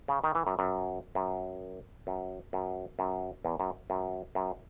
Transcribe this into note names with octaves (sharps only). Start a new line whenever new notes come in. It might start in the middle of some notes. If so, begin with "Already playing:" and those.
C#3
D#3
E3
F#2
F#2
F#2
F#2
F#2
F#2
E2
F#2
F#2
F#2